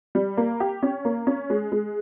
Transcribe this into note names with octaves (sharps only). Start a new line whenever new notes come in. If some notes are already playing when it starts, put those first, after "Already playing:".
G3
A#3
G4
C#4
A#3
C#4
G#3
G#3